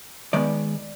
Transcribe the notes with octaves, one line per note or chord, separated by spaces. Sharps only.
D#3 G#3 B3 D5